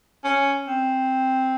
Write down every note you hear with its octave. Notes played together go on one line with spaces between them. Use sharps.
C#4
C4